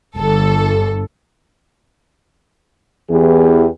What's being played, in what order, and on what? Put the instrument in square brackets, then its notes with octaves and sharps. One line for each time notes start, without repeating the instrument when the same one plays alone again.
[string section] G1 A4
[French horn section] E2 E3 B3 G4 G#4